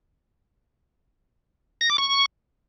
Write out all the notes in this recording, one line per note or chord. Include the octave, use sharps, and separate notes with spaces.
A#6
D6
C#6